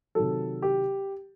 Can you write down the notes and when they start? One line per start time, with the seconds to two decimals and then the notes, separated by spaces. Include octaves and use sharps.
0.15 C3 D#3 F#3 A4
0.62 G4